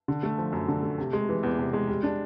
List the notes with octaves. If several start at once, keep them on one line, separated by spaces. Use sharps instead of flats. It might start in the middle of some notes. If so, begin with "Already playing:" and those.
D3
A3
F3
F#2
D3
A3
C3
G#3
E3
E2
C3
G#3
G3
D4